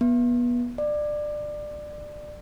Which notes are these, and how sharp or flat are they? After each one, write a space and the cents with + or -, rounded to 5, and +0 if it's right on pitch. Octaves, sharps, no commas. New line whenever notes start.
B3 -25
D5 +20